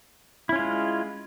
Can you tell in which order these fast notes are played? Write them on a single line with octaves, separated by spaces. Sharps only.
E4 C#4 F4 G#3